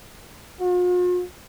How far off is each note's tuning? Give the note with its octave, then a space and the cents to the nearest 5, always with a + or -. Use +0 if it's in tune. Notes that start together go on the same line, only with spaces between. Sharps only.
F4 +45